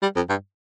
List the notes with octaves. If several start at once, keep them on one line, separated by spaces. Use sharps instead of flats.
G3
F2
G2